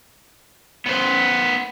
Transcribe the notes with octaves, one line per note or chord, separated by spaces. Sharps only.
B3 C5